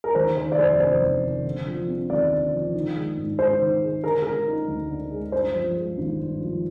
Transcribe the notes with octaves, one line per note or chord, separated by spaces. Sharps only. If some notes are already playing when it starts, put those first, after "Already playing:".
A#4
D#2 C5
D#3 C5
D5
F1 C5
F1 C5
D#2
D#3
D3
F3
C4
D#2 D5
D3
F3
D#3
G#3
G#2
G#2 C5
D#3
G#3
D3 A#4
G#3 A#4
D#4
D2
D3
G#3
G2 C5
F3
G#3
G#1
G2
F3